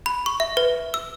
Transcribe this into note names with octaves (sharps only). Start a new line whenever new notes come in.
B5
C#6
E5
B4
E6